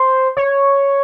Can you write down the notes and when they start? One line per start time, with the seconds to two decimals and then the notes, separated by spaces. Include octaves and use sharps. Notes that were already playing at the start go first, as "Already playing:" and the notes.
Already playing: C5
0.37 C#5